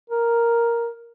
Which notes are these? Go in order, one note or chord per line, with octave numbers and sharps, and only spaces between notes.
A#4